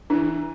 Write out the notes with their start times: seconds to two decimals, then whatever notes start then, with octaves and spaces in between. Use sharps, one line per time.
0.10 E3 D4